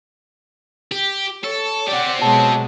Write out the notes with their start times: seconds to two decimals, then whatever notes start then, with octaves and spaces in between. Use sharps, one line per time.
0.92 G4
1.44 A4 C#5
1.88 C4 G4 D5 F#5
2.21 B2 F#3 G#3 A5